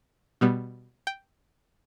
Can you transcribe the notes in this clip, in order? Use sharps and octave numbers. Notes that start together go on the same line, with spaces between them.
B2 G3 B3
G5